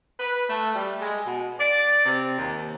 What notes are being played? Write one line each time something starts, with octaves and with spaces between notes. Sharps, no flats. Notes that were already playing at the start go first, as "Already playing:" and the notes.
B4
A3
G3
G#3
B2
D5
C3
D#2